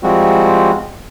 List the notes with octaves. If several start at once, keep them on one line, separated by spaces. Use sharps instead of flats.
F3 G3 G#3 C4 F#4